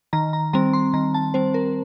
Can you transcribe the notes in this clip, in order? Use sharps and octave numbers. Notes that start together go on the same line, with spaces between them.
D#3 A#5
A#5
G3 C4 A#5
C6
D#3 A#5
A5
G3 C4 C5
A#4